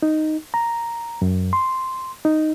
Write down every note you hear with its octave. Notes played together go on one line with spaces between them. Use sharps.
D#4
A#5
F#2
C6
D#4